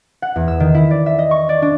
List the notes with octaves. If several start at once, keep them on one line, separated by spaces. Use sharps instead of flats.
F#5
E2
E6
D#3
E4
D5
E5
D#5
C#6
D5
D4